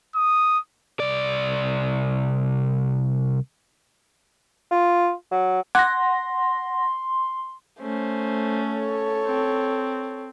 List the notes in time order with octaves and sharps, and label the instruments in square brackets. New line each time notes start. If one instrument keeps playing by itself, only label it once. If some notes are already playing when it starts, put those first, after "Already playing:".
[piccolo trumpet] D#6
[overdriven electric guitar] C2 D5
[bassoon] F4
F#3
[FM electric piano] F#5 A#6 [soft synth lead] C6 [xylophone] D6 F#6 G#6
[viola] A3 C#4 [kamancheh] C5
[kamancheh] A4 C#5
[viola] C4